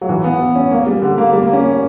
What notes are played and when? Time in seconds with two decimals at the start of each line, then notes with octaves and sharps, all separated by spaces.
0.01 F#3
0.09 E3
0.24 B3
0.55 C#4
0.71 A#3
0.87 G3
1.02 D3
1.18 A#3
1.33 G3
1.43 A#3
1.53 C#4